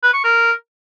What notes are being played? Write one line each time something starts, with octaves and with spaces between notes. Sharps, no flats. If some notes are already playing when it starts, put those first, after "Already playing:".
B4
C#6
A#4